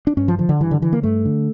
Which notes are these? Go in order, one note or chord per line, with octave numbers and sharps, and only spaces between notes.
D4
G2 C#4
F3
D3 F3
D3
G2 E3
D3
D3 E3
A#3
G2 A3
D3